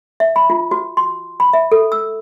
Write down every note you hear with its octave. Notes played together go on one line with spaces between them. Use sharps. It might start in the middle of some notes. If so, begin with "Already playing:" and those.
E5
B5
F4
F#4
C6
B5
E5
A4
E6